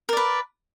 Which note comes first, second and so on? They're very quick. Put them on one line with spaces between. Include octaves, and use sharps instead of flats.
A#4 D5 B4